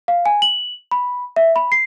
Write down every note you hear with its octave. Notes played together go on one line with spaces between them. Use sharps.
F5
G#5
F#7
B5
E5
B5
C7